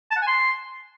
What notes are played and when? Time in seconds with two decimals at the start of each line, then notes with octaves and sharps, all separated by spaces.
0.11 A5
0.16 F#5
0.22 G#5
0.27 C6